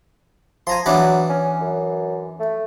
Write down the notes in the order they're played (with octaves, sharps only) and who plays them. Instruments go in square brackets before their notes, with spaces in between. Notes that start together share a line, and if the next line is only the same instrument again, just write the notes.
[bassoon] F3 [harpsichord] G#5 A#5 C6
[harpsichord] E3 B3 D4 [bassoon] F#3
[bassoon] C#4
F#2
A3